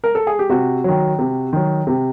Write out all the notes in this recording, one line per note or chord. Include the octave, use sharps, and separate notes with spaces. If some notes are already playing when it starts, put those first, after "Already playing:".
A#4
A4
G#4
G4
C3 F#4
D#3 F#3
C3
D#3 F#3
C3